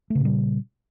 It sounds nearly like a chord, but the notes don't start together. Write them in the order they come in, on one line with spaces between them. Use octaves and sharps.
A3 C#3 A#2 G3